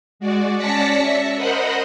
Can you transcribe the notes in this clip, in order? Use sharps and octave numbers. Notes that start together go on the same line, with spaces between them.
G#3 F#4 D5
C#4 D5 A5 A#6 B6 C#7
E5
A#4 C5 D#5 F#5 B5